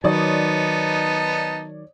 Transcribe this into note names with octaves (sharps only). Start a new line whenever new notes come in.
D#3 F#3 B3 D#4 C#5 D5 A5 D#6